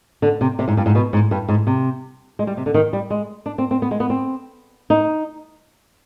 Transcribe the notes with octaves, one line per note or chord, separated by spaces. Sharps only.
D3
C3
C3
G#2
G2
G#2
B2
G#2
G2
G#2
C3
G#3
G3
C3
D3
D#3
G3
G#3
D4
C4
C4
B3
G#3
B3
C4
D#4